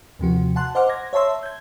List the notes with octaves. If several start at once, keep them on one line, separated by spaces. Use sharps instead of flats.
D#2 C3 F3 F#4
F#5 A5 C6 F#6
C5 D#5 F#5 C6 D6 F6
G#6 A#6
C#5 E5 A5 C6 E6
G6 G#6